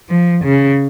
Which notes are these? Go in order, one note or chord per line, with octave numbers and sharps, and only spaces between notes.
F3
C#3